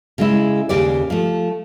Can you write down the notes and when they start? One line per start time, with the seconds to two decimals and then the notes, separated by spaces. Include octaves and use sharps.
0.18 C#3 G#3 E4
0.69 D#2 C#3 G4 D5
1.10 F3 A3